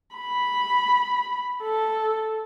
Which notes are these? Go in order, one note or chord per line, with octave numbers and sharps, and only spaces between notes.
B5
A4